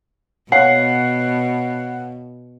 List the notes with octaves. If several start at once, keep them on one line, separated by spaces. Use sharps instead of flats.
B2 C#5 F5 F#5 C7